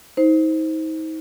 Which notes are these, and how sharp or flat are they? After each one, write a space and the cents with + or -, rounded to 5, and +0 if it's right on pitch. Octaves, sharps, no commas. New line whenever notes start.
D#4 +35 C5 +0